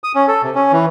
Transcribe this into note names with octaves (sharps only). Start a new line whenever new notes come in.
D#6
C#4
A4
C3
C#4
E3